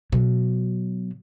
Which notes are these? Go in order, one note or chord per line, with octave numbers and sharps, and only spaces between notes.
B2 F#3